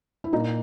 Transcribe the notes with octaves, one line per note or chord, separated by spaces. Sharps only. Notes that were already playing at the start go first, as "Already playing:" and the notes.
E4
A#2 D#4